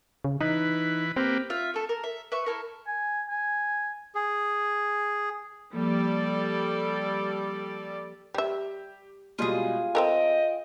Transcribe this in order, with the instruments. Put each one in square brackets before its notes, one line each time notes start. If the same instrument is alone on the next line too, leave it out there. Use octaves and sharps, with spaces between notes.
[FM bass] C#3
[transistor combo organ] E3 B4 [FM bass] D#4
[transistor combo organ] A#3 G4 B4 [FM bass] C4
[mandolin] F4 E5
A3 A4
A#4
E5
B4 E5 C#6
E4 A4 A#4
[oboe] G#5
G#5
[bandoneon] G#4
[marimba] F3 A#3 [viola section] G3 A4 D5
[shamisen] G3 E5 [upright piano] G4
[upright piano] B2 G3 G#3 [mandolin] F4 G#4
[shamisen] C4 A4 A#4 [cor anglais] D#5 [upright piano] G5